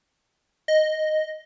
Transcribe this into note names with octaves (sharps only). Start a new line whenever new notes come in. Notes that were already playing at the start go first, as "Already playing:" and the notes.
D#5